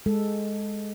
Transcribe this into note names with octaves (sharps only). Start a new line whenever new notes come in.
G#3 A4